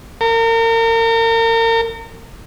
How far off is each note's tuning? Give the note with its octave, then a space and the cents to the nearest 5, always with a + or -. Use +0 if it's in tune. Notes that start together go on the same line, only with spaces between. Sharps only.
A#4 -35